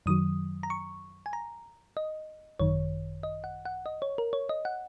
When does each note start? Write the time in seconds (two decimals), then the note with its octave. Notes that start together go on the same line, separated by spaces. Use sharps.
0.06 F#2 D#3 F#3 D#6
0.63 A#5
0.70 C#6
1.26 G#5
1.33 A#5
1.97 D#5
2.60 G#1 F#2 D#3 C#5
3.23 D#5
3.44 F#5
3.65 F#5
3.86 D#5
4.02 C#5
4.18 A#4
4.33 C#5
4.49 D#5
4.65 F#5